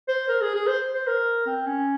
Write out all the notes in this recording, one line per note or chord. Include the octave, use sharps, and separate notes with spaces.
C5
A#4
G#4
G#4
C5
C5
A#4
C4
C#4